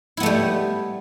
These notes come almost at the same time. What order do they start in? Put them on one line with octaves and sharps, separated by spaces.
E4 B3 A3 G3